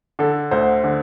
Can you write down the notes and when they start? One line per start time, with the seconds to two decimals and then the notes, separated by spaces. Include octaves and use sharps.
0.19 D3 A4
0.51 D2 C5
0.84 D3